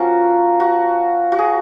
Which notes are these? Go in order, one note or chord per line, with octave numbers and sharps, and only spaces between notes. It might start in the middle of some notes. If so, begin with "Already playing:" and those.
Already playing: F3 A#3 C#4 F#4
F#4
F#4
G#4